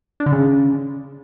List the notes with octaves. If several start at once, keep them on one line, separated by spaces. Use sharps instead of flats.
D4
D3
C#3